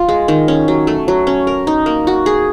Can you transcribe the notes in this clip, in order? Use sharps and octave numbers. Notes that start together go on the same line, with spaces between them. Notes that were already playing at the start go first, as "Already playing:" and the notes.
Already playing: F4
G#3
D#3
C#4
F#3
A3
F#3
C#4
A#4
D#4
A#3
F#4
G#4